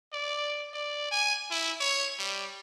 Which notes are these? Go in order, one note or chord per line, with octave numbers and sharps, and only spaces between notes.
D5
D5
G#5
E4
C#5
G3